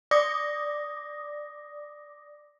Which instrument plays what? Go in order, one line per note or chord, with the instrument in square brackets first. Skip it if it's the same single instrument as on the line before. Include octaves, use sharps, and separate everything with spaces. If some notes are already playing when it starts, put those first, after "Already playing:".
[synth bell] D5 D6 D#6 A#6